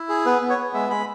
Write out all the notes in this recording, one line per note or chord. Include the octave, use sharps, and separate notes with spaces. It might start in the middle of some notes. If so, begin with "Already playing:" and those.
Already playing: E4
G#4
B3 B4
B3
C#5
B3
G#3 E5
G#3 B5